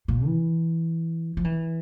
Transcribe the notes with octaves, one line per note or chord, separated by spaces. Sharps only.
A#2
E3
F3
E3